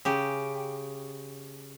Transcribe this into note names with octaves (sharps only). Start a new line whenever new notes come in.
C#3 G4